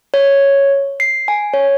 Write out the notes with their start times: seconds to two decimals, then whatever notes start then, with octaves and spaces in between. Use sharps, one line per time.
0.14 C#5
1.00 C7
1.28 G#5
1.54 C#5